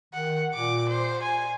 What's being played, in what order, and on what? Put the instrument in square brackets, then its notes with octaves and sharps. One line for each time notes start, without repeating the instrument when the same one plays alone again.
[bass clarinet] D#3 [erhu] F#5
[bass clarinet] A#2 [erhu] D6
[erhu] C5
G#5